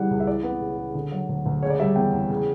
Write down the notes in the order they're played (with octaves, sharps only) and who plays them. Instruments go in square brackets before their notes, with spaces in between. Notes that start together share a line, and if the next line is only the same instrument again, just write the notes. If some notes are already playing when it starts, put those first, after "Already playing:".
Already playing: [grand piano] C#3 E3 G3 F#5
C#2
E5
E3 D5
B3
C#3
C#3
D3
F#3
D2
D2
C#3 C#5
D5
G3 E5
E2 G5
E2
C#3